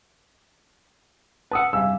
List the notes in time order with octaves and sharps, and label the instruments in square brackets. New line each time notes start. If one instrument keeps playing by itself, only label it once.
[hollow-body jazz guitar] B4 F#5 [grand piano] A5 D#6 E6
[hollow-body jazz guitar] G2 C3 G3 [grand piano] F5 G#5 E6